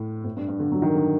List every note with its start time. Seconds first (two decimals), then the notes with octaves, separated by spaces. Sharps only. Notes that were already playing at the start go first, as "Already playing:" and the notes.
Already playing: A2
0.24 A2
0.37 G2
0.48 G2
0.59 D3
0.72 F#3
0.82 D#3
0.95 D3